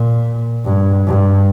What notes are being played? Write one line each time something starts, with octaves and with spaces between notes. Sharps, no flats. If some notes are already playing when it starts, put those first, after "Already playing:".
Already playing: A#2
G2
G2